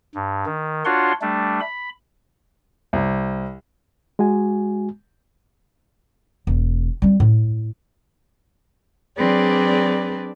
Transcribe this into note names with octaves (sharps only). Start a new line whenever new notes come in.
G2
D#3
D4 F4 F#4 C#5 F#5 C6
G3 A3 D4
B5
C2
G#3 F#4 G#5
E1
G3 C4
A2
F#3 C4 D4 G#4 B4 D5